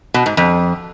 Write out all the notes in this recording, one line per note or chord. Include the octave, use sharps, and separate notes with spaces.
B2
G#2
F2